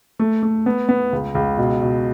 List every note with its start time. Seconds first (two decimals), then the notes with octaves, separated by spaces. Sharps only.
0.19 A3
0.43 A3
0.66 B3
0.89 B3
1.13 C#2
1.35 C#2
1.58 B2
1.82 B2